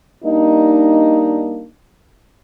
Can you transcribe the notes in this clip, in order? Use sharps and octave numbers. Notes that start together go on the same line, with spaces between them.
G3 A#3 D4 D#4